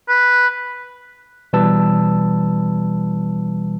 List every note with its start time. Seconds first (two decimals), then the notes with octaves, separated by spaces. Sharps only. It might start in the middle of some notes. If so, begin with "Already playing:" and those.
0.09 B4
1.53 B2 E3 G3 B4 A5 E6